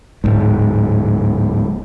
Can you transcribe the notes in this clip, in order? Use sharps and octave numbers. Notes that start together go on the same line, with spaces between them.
D1 G1 G#2